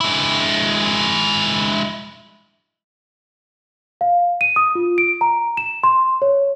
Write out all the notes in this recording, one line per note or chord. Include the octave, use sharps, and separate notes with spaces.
G#3 E4
F5
D#7
D#6
F4
D7
A#5
E7
C6
C#5